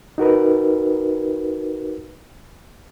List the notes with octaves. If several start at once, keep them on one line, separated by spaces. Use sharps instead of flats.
D#4 F#4 A#4 B4